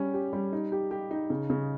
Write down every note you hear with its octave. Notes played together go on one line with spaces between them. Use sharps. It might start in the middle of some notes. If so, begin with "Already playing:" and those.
Already playing: G3 C#4
G4
G3
D#4
G4
G4
D#4
C#3
C#3